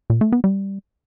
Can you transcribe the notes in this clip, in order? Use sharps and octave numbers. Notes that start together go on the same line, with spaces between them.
A#2
A3
B3
G3